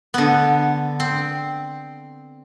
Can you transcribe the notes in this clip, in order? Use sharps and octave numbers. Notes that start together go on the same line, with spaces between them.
D3 B3
C4